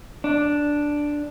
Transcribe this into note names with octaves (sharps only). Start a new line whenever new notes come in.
D4